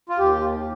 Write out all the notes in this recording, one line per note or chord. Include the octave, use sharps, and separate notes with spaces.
F4
D#2 G4